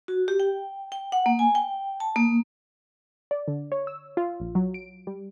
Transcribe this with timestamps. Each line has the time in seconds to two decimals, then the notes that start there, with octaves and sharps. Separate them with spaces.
0.08 F#4
0.28 G4
0.40 G5
0.92 G5
1.12 F#5
1.26 A#3
1.39 G#5
1.55 G5
2.00 A5
2.16 A#3
3.31 D5
3.48 D3
3.72 C#5
3.87 E6
4.17 F4
4.40 A#1
4.55 F#3
4.74 D7
5.07 G3